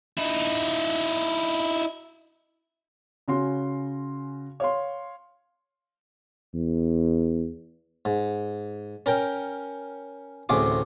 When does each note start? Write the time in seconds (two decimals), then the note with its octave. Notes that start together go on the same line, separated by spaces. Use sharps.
0.17 D#4 E4
3.28 C#3 C#4 F#4 C6
4.60 C#5 F5 C6
6.54 E2
8.05 G#2
9.06 C#4 A#4 G5
10.49 A1 D2 C3 G#4 D6